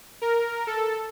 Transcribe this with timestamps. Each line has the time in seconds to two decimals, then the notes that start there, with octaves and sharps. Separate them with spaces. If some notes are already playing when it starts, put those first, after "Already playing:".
0.22 A#4
0.67 A4